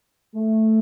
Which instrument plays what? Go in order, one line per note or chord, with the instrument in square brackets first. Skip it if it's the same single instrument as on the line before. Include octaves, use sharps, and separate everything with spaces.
[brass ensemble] A3